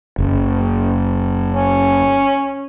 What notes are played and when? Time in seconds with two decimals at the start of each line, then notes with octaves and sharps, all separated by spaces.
0.18 F#1
1.54 C#4